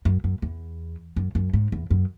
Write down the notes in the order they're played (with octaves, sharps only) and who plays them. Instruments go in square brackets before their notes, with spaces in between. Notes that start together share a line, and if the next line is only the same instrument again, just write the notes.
[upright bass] F#2
F#2
E2
F#2
F#2
G#2
E2
F#2